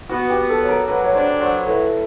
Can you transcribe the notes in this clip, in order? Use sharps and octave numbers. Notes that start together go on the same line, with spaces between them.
B3 F#4
G4
B3
A4
F#3
A#4
F#3 B4
C#5
D4 C5
F#3 C5
A2 B4